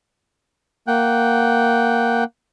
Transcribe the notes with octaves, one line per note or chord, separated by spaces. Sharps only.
A#3 F#5 G5